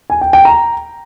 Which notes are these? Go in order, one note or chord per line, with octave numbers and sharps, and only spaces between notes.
G#5
G5
G5
A#5